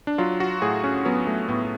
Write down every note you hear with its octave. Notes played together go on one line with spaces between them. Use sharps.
D4
F#3 F4
F#4
A2 G#4
C#4
F#3 B3
A3
A2 B3